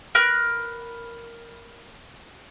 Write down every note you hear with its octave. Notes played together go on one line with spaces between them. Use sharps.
A#4 B4 F#6